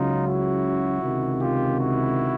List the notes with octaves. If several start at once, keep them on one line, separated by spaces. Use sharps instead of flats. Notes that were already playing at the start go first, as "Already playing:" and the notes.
Already playing: C#2 C#3 F#3 D#4 F4
E4 F#4
C#2 C3 D#3
F4 G4
E4 F#4